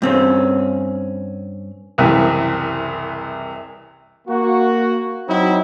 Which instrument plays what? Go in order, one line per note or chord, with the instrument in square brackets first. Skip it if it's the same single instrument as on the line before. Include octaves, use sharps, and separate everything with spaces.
[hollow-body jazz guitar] G2 C4 C#4
[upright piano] F#1 C2 C3 E3
[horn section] A#3 F#4
F#3 C4 D#4 E4